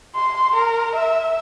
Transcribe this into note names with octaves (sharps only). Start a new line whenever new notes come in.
C6
A#4
E5